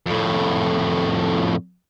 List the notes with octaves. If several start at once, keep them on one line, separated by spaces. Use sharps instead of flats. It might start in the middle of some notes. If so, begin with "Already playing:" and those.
F2 A2